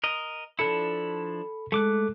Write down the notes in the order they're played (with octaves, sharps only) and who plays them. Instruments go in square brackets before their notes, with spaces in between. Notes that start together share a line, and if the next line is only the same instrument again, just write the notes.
[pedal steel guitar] A#4 D#5
[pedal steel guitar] F3 D4 E4 [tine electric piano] A4 B5 C#7
[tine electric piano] G#3 A4 [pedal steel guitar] A3 D6 F#6